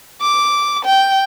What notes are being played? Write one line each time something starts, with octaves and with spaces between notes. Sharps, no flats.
D6
G5